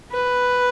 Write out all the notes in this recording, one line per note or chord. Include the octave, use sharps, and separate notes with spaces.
B4